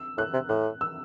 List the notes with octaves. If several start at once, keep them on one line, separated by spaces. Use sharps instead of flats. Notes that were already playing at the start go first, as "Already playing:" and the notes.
Already playing: E6
A2 F#6
C3
A2 F#6
E6